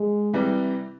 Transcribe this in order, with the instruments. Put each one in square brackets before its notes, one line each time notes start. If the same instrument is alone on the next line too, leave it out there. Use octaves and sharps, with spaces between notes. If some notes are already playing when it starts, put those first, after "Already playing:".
Already playing: [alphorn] G#3
[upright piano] C3 E3 G3